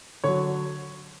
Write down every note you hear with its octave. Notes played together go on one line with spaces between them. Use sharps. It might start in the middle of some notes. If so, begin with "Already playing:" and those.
D3 F#3 C#5